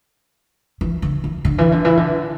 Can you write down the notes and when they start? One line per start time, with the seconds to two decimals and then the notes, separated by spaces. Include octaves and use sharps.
0.81 E3
1.02 D3
1.24 E3
1.45 D3
1.58 E3
1.72 D3
1.85 E3
1.97 D3